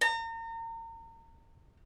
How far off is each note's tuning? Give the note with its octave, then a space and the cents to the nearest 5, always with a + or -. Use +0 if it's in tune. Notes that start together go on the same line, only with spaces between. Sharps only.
A#5 -35